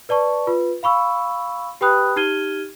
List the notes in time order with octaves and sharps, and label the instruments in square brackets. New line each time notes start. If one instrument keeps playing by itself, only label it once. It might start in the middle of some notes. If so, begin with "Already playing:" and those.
[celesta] B4 D5 A5 C#6
F4 B4
F5 B5 C#6 E6
G4 B4 G5 B5 D#6 F#6
D#4 G4 F6 G#6 D#7 G7